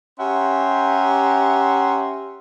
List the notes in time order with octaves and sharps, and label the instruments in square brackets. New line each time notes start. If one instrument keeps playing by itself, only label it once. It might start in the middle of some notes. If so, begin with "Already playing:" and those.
[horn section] C#4 G4 E5 F#5 A#5 C6